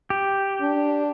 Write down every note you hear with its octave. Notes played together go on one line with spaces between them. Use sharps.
G4
D4